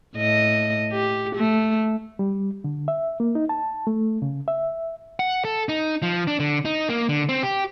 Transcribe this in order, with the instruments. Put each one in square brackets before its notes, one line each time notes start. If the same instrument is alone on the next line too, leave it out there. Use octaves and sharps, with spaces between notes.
[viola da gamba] A2 D#5
G4
A3
[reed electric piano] G3
D3
E5
A#3
D#4
A5
A3
C#3
E5
[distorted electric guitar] F#5
A4
D#4
F3
D4
D3
D#4
A#3
D3
C4
G4